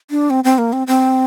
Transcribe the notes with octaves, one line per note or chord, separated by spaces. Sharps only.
D4
C4
C4
A#3
C4
C4